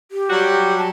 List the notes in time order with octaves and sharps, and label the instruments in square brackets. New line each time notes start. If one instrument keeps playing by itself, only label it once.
[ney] G4
[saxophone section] F#3 G3 F#4
[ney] A5